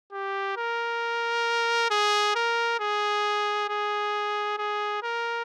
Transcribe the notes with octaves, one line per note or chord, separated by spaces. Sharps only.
G4
A#4
G#4
A#4
G#4
G#4
G#4
A#4